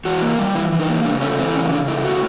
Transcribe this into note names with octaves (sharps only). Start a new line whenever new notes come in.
E3 F#4
A#3
G3
E3 E4
E3
D#4
A#3
C#3 D4
A3 C#4
E3 C4
C#3 C#4
C#3 D4
A3 E4
A2 F#4